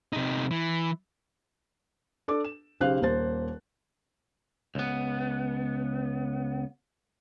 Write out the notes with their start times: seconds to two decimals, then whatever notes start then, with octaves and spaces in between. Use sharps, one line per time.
0.13 C3 D#4
0.51 E3
2.28 D4 A4 D6
2.44 E7
2.80 B1 C#3 G4 C5 F5 F#6
3.01 D#1 A#3 C5 A6
4.75 C#2 B3